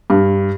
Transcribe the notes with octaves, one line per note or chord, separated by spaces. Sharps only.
G2